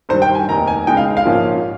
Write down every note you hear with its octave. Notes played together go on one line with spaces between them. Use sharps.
G2 D#3 G3 C5
G5
G#5
F1 D#2 D#3 A#5
G#5
C#2 C#3 G#3 D#4 G5
F5
F5
A#1 G#2 F3 A#3 C#4